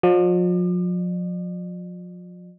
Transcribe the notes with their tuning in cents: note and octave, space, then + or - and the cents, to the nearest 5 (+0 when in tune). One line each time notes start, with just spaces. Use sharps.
F3 +40 D5 +45